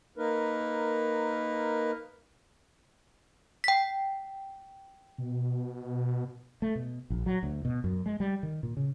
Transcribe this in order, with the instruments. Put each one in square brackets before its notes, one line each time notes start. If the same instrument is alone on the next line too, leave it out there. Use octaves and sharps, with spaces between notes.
[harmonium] A#3 D#4 A#4 B4
[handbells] G5 B6
[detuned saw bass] B2
[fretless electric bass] A3
B2
A#1
F#3
D2
B2
F#2
G#3
G3
D#3
A#2
C#3